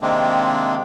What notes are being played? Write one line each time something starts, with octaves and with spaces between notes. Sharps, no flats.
C3 D#3 G#3 A#3 C4 D4